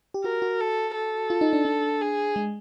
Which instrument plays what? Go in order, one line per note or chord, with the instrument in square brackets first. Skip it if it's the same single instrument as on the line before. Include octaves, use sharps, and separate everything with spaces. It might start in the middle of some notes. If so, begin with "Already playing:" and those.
[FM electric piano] G4
[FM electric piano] F#4 [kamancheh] A#4
[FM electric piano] F#4
[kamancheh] A4
A4
[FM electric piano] F4
D#4
D4
D4
[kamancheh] G#4
[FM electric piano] G#3